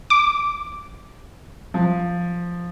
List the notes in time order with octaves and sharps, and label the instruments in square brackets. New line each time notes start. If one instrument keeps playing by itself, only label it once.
[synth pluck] D6
[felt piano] F3